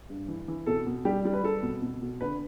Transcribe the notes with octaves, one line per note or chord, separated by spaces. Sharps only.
G2
E3
E3
B2 A4
B2
G3 G4
G3
B4
G3 A4
B2
B2
B2
D3 B4